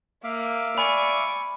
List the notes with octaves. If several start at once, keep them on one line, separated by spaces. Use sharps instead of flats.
A#3 E5 F5 D6
D5 G#5 B5 C#6